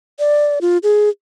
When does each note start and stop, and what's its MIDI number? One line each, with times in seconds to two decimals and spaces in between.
0.19 0.59 74
0.61 0.78 65
0.83 1.09 68